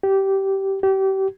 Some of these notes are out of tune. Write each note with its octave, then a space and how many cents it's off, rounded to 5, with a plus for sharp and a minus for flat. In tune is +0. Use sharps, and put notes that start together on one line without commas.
G4 -15
G4 -30